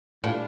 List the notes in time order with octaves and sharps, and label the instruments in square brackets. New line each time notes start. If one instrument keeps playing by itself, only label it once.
[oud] A2 [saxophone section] E3 G3 D4 F4